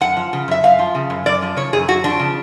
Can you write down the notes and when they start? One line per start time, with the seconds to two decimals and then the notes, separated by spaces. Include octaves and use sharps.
0.01 F#2 F#5
0.17 F3
0.33 C#3
0.48 F#2 E5
0.64 F#2 F5
0.79 F3
0.95 C#3
1.10 F#2
1.26 F#2 D5
1.42 F3
1.57 C#3 C#5
1.73 F#2 G#4
1.88 F#2 F#4
2.04 F3 D4
2.19 C#3